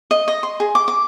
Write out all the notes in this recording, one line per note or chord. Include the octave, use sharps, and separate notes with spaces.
D#5
D#5
C6
G#4
D6
D6